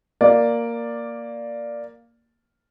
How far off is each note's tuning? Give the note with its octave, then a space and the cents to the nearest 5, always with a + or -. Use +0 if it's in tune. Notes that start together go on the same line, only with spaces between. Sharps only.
A#3 +0 D5 +0